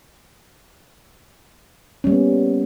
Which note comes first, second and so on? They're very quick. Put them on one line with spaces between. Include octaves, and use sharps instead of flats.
C#4 G3 A#3 B3